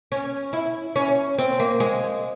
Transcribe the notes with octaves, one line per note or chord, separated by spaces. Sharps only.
C#4
E4
C#4
C4
A#3
G#3